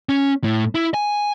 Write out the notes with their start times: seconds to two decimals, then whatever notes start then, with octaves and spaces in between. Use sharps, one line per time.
0.09 C#4
0.44 A2
0.75 E4
0.94 G#5